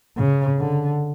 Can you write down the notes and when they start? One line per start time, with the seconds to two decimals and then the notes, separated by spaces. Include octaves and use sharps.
0.18 C#3
0.59 D3